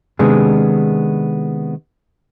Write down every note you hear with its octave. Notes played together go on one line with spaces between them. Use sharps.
C3 D#3 G#3 B3 D4 G#4